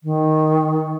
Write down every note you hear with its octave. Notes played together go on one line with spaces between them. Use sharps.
D#3